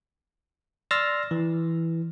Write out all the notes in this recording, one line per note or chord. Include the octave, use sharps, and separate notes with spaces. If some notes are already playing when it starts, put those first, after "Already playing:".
D5 C6 E6 F6 A6 A#6
E3